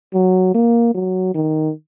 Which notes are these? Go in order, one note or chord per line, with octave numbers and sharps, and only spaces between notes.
F#3
A#3
F#3
D#3